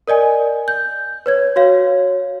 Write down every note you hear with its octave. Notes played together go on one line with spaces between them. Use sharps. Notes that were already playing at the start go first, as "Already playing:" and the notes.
A#4 D5 D#5 G#5
G6
B4 C#5 G#6
F#4 C#5 F5